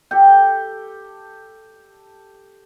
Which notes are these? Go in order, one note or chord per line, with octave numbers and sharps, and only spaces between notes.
G4 A4 G5